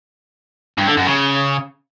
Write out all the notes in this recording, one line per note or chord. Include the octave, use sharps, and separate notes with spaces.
G2
D3
F#2
C#3